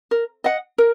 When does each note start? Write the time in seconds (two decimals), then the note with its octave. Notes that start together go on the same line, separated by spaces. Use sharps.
0.11 A#4
0.44 D#5 F#5
0.78 A#4